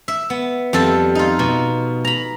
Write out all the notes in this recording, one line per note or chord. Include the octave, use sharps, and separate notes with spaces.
E5
B3
F2 G3 A4 A5
D#4 F4
B2
A#5 B5